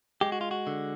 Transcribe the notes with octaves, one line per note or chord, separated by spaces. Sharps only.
G#3 G4
F#4
F4
F#4
D3